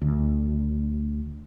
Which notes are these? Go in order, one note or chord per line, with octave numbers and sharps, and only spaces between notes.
D2